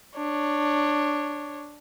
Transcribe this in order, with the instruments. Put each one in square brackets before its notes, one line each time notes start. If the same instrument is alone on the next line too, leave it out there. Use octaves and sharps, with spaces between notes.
[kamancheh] D4 C#5